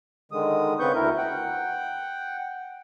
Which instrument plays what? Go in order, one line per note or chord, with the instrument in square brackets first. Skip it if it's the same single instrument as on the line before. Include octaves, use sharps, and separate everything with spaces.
[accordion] D3 D#3 G#3 D#6
C#3 B3 C4 B4 C#6 G6
D2 E4 A#4
F#5 G5